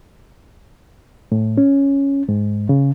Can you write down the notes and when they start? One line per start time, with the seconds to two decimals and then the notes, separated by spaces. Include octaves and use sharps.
1.32 A2
1.58 C#4
2.29 G#2
2.69 C#3